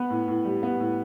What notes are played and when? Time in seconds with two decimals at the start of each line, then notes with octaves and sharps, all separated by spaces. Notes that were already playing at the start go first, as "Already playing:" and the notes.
Already playing: B3 B4
0.10 A2
0.28 A2
0.45 G3
0.63 B3
0.80 A2